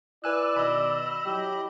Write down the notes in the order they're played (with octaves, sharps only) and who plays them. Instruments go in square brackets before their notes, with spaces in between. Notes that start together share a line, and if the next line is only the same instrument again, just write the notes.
[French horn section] E4 [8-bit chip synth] B4 G#5 F#6 [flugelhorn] D5 [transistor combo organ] E6
[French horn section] B2 D#3 [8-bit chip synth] D#5 B5
[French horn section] F#3 E4 [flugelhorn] G4